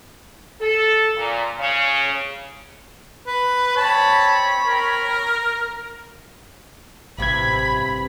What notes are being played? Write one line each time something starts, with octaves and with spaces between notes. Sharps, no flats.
A4
A#2
C#3
B4
C4 C#5 A5 B5
A#4
A1 G2 C3 E3 B5 G#6